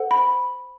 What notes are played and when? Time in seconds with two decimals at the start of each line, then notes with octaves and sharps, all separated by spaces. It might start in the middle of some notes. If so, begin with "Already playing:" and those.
Already playing: A4 C5 F#5
0.11 B5